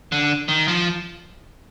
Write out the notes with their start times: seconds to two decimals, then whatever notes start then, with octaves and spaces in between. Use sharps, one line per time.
0.12 D3
0.48 D#3
0.68 F3